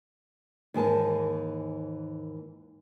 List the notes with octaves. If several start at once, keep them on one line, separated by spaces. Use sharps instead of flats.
D#2 G#2 E3 G#4 A#4 A5